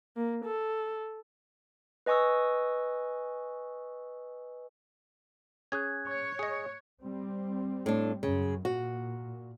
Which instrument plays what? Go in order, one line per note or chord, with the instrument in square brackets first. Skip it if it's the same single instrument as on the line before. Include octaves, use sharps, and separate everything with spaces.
[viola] A#3
A4
[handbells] B4 D#5 G#5 C#6 D#6 E6
[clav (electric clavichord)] C#4 G#4 [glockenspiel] F#6 G#6
[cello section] C#5 [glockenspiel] C#6 G#6
[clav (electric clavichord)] G#4 D#5
[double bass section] G3 C4
[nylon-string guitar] A2 D4
[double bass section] F#2 [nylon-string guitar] C#3
[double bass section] A#2 [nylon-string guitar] F#4